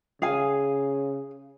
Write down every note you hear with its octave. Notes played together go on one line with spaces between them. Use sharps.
C#3 G#4 F5 G#5